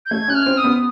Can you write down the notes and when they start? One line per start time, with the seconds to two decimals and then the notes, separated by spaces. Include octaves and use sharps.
0.06 G6
0.11 A3 G#6
0.28 C#4 F#6
0.35 F6
0.46 C4
0.58 D#6
0.64 B3